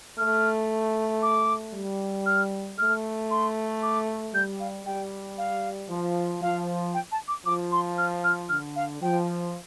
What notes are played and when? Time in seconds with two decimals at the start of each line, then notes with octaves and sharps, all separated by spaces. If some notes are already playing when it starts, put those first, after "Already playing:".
0.18 A3 F6
1.22 D6
1.74 G3
2.26 F6
2.78 A3 F6
3.31 C6
3.83 D6
4.34 G3 G6
4.60 F5
4.86 G3 G5
5.38 F5
5.89 F3
6.42 F3 F5
6.94 G5
7.12 A5
7.28 D6
7.46 F3 D6
7.72 C6
7.98 F6
8.24 F6
8.49 D3 F6
8.76 F5
9.02 F3 G5